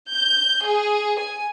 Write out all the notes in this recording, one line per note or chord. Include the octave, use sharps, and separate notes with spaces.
G6
G#4
G#5